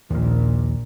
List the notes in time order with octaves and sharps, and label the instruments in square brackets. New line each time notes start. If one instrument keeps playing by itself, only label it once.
[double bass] A#1 A#2 [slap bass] D#2 F3